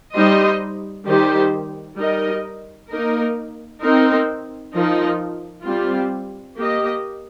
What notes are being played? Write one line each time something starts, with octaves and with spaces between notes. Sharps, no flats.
G3 D#4 C5 D#5
D#3 G3 D#4 G4 C5
G3 D#4 A#4 D#5
A#3 D#4 A#4
C4 D#4 A#4
F3 D#4 A#4
G3 C4 F4
A#3 G4 D#5